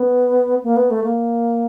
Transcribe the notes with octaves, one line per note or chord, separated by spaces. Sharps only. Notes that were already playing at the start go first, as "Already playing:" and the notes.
Already playing: B3
A#3
B3
A3
A#3